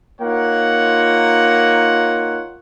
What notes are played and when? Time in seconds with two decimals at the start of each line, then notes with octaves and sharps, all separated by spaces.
0.20 A#3 D#4 F4 C#5 F#5